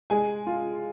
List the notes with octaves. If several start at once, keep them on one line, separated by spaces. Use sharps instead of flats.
G#3 G#5
F4